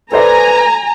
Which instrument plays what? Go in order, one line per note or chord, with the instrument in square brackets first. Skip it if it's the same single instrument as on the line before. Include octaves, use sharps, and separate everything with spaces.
[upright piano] A4 C5 D5 [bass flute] B4 [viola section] G#5 A#5